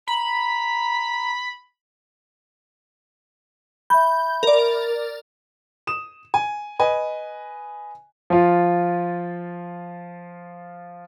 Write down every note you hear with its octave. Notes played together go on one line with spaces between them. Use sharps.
A#5 B5
E5 B5 G6
A#4 D5
D#6 E7
G#5
B4 D#5 G#5
F3 F4